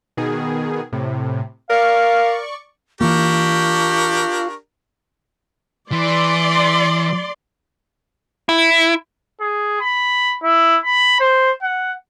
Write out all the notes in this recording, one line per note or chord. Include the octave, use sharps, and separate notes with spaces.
B2 D#3 G#4
A2 C3
A#4 D5 F5 C#6
E3 A#3 D4 F4 G4 A#4 C#6
E3 D5 C6
E4
G#4
B5
E4
B5
C5
F#5